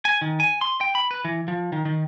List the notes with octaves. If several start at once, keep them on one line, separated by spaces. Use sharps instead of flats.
G#5
D#3
G#5
C6
G5
B5
B4
E3
F3
D#3
D#3